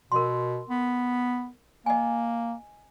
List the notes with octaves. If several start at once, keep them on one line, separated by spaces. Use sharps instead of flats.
B2 A#4 C6
B3
A#3 D#5 G#5